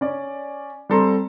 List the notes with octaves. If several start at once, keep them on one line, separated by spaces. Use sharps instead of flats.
C#4 D5
G3 C4 A4 A#5 C6